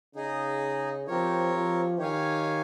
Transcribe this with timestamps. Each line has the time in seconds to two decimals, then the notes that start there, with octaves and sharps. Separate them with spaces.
0.15 C#3 D#4 G#4 D#5
1.07 F3 C4 G4 A#4 C#5
1.54 F3
1.99 D#3 G4 C#5 F5 G#5